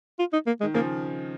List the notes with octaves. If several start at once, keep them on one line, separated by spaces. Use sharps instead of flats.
F4
D#4
A#3
D#3 G#3
C#3 F3 A#3